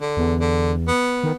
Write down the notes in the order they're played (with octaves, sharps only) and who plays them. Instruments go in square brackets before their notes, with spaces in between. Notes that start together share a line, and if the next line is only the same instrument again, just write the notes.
[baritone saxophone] D3
[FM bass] E2
[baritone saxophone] D3
B3
[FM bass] D#3